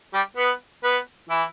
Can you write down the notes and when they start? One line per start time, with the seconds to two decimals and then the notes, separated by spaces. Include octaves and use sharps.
0.14 G3 G4
0.37 B3 B4
0.83 B3 B4
1.29 E3 E4